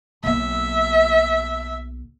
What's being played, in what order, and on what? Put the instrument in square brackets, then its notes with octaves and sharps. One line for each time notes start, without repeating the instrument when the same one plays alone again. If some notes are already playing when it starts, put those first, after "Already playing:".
[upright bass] B1 A#3 [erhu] E5